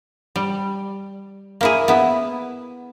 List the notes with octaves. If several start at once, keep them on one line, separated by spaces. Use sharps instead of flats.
G3
A#3 E4 G#4
B3 E4